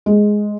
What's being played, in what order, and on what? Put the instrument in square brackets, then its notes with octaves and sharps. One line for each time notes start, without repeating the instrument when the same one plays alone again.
[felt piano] G#3